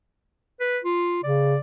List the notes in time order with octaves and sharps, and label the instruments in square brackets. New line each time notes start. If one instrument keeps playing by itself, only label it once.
[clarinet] B4
F4
[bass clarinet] C#3 [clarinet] D5